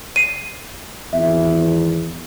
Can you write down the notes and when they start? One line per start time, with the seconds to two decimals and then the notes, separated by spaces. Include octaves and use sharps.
0.16 C7 D#7
1.13 G#1 E2 E5